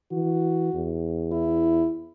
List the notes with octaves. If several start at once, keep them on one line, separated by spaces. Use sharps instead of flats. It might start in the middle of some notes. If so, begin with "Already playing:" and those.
E3 F#4
E2
E4